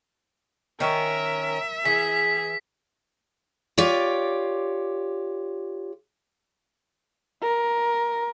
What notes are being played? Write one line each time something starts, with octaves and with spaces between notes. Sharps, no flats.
D#3 C#4 A#4 E5
E3 G#4 B6
F4 G4 C#5 D5
A#4